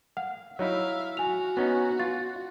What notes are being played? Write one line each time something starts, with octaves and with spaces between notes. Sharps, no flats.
F5 F#5
F#3 D#4 E4 C#5 E5 F5
F#4 G#5 F7
B3 C#4 D#4
F4 A6